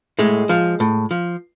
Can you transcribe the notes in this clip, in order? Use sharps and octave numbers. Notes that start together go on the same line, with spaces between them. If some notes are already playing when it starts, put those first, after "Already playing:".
A2 G#3
F3
A2
F3